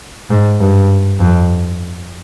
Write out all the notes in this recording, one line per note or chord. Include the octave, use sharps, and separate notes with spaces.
G#2
G2
F2